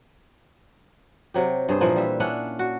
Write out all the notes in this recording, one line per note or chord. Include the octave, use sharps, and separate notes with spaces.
C3 F#3 G4
G2 G#4 C5
A#2 E3 F3 A#3
G3 E5
C#4 D4 E4 F#5
F#4